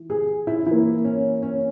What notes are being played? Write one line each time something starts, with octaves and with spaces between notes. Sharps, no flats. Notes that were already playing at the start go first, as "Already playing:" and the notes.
Already playing: E3
G#4
E4
E3 A#3 E4
C#4
C#4